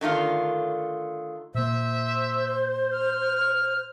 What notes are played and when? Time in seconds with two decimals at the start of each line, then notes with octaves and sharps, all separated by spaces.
0.01 D3 D#3 A3 F4
1.54 A#2 A#3 C5 E5
2.92 F6